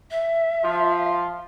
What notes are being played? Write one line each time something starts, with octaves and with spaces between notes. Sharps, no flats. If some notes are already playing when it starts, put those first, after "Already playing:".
E5
F3 F4